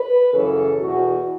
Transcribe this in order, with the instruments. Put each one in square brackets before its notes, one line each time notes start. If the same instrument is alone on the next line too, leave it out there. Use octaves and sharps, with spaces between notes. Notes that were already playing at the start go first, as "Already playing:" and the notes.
Already playing: [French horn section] B4
F#2 C#3 E3 A4
E2 B2 F#4